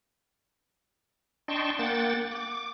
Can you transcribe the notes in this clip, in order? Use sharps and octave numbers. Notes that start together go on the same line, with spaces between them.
D4 D#5 G5 A5 C6 C#6
A#3 F#5 G5 A6
D6